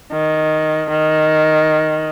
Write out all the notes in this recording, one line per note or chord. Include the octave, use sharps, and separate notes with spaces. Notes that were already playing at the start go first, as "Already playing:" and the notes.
D#3
D#3